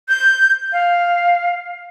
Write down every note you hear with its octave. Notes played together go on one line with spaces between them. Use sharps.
G6
F5